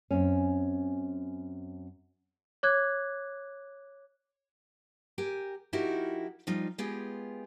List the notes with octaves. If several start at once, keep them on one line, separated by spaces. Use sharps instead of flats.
F#2 C4 C#4
C#5 D6 F#6 G#6
G4 A#4 G#5
F3 D#4 E4 F#4 G4 A#4
F3 G3 D#4 F4
G#3 B3 F4 G4 G#4